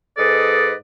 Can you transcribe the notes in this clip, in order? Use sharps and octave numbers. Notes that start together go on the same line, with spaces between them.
G#2 G#4 A4 B4 D5 D#5